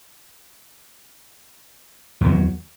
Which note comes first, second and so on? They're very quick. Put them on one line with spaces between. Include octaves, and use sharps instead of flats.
E2 D#3 F#3